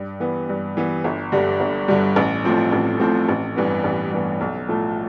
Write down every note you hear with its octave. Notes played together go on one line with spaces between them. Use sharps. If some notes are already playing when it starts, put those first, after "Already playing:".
Already playing: G2
E3 B3
G2
E3 B3
G1
G2 D3 G3
G1
G2 D3 G3
A1
A2 F3 C4
A1
A2 F3 C4
A1
G2 E3 B3
A1
G2 E3 B3
B1
A2 F3 A3